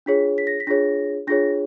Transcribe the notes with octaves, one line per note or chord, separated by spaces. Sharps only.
D4 F4 G#4 C#5 B6
B6
A#6
B6
D4 F4 G#4 C#5 A#6
D4 F4 G#4 C#5 A#6